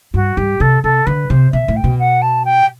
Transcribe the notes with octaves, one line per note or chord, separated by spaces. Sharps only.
G2 F#4
G2 G4
C3 A4
C3 A4
D3 B4
C3 C5
B2 E5
A2
G5
B2
F#5
A5
G5